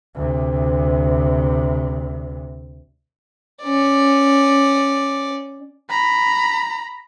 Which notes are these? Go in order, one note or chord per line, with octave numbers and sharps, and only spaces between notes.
D2 C3
C#4 D5
A#5 B5